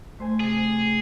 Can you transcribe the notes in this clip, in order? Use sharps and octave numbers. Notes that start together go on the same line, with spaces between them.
A3 C5 G#5
C3 G#4